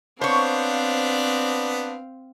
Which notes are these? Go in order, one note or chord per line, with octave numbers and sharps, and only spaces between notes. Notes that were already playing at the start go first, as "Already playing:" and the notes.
B3 C4 D4 C5 C#5 F5